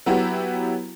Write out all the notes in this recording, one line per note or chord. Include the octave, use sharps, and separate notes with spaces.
F#3 B3 E4 F#4 G4